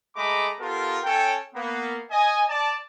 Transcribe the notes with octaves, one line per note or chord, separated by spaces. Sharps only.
G#3 A3 D#5 A#5 B5 D6
B3 F4 G4 A4 A#4
C#4 A4 C#5 G5
A#3 B3
D#5 G#5
D5 A5